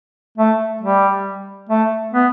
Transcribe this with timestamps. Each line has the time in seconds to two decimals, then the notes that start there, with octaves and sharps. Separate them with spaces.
0.38 A3
0.81 G3
1.69 A3
2.14 B3